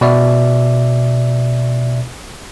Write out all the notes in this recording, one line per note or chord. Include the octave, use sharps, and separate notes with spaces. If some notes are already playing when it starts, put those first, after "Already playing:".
B2 D5 E5